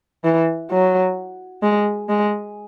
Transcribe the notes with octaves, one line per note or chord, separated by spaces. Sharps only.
E3
F#3
G#3
G#3